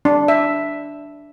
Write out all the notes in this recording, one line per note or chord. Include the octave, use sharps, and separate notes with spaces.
D4
E5